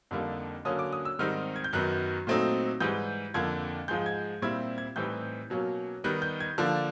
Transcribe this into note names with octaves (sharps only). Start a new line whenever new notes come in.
F2 D3 G3 A#3 D#4
D3 F#3 A#3 C#4 D#6
D6
D#6
E6
G#2 D#3 G3 C4 D#4 F6
G#6
G6
F#2 D#3 F#3 B3 F#6
A#2 F#3 A3 C4 D#4
G#2 E3 G3 G6
F2 D3 F3 A#3 G#6
G#2 F3 G#3 G6
G#6
A#2 G3 C4 E4 G#6
G#6
A2 E3 G3 C4 D#4 G6
B2 F#3 A#3 C#4
D#3 G3 B3 D#4 F#6
G6
G#6
D3 F3 A#3 D4